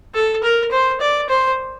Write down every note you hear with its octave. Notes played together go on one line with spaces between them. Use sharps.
A4
A#4
C5
D5
C5